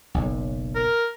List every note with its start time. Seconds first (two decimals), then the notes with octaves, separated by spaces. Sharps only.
0.14 F#1 B1
0.75 A#4